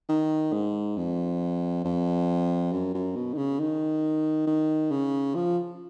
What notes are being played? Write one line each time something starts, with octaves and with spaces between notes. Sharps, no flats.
D#3
G#2
F2
F2
F#2
F#2
B2
D#3
C#3
D#3
D#3
C#3
F3